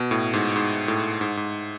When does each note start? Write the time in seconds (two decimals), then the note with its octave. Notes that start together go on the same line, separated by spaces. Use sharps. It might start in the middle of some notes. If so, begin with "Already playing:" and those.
Already playing: B2
0.11 A2
0.33 G#2
0.56 G#2
0.88 A2
1.21 G#2
1.37 G#2